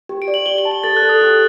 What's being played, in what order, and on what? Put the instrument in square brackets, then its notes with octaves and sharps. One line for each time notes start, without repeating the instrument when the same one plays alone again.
[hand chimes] G4
[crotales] D7
[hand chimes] D5
[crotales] F#7
[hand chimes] G4 [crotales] G7
[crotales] G7
[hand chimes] A5
[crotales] F#7
[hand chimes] A4 [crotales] A6
[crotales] F#6
[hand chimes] A4
[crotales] D#6
[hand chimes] G4